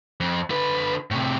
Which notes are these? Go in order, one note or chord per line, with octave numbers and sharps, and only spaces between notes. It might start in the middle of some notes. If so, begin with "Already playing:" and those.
F2
D3 B4
A2 C3